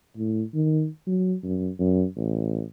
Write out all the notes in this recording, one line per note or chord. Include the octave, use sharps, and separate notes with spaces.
A2
D#3
F#3
F#2
F#2
A1